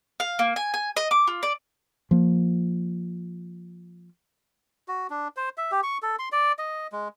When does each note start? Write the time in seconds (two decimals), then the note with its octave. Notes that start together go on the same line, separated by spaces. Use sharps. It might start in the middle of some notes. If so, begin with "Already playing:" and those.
0.20 F5
0.39 A#3
0.56 G#5
0.74 G#5
0.97 D#5
1.11 D6
1.27 F4
1.43 D5
2.11 F3 A#3
4.88 F#4
5.10 D4
5.37 C5
5.58 E5
5.72 G4
5.83 C#6
6.02 A4
6.19 C6
6.32 D5
6.59 D#5
6.92 G#3